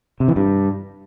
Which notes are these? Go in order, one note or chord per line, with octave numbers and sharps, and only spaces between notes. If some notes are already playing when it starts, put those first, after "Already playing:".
C3
E3
G2